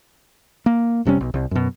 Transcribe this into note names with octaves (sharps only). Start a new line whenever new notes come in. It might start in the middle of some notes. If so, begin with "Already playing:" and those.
A#3
F1 C3 G3 C#4
B1
C2
F#2 B2